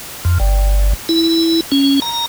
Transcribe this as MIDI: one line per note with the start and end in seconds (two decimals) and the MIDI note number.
0.25 0.38 41
0.40 0.93 31
1.09 1.61 64
1.72 2.00 61
2.02 2.26 82